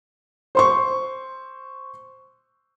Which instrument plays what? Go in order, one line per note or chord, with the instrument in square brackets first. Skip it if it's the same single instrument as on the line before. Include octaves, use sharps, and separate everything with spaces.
[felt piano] C5 C6 C#6